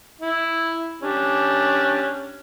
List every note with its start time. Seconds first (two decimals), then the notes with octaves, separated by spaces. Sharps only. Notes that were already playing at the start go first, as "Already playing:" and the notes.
0.22 E4
1.02 C#4 D4 G4